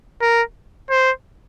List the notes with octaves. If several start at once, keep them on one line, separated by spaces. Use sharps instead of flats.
A#4
C5